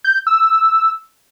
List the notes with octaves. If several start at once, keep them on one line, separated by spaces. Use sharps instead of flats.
G6
E6